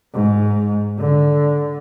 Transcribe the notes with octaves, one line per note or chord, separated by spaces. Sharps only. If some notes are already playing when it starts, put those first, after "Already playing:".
G#2
D3